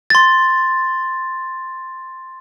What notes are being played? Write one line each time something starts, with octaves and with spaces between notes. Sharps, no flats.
C6 A6